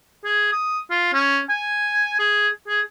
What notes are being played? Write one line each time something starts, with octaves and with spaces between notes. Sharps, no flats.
G#4
D#6
F4
C#4
G#5
G#4
G#4